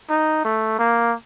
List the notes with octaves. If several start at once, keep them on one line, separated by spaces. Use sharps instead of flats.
D#4
A3
A#3